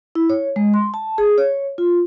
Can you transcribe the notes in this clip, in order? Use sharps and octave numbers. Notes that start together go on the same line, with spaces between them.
E4
C#5
G#3
C6
A5
G#4
C#5
F4